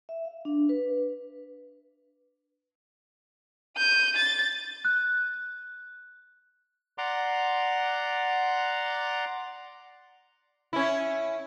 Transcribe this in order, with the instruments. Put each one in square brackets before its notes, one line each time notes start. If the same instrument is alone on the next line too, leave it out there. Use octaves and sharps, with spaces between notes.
[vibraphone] E5
F5
D4
B4
[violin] G6 D#7
A6
[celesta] F#6
[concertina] D5 F#5 A#5 C6 D6
[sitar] C#4 E4